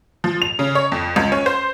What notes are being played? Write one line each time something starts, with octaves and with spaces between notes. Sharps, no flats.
F3
F7
C#3
C#5
F2
C#2
C#4
C5